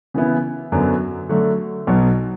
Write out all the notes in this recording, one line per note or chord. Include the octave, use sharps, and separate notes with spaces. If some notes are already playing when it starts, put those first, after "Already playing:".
C#3 E3 B3 E4
F#2 D3 F#3 B3
D3 F#3 A3
B1 B2 F#3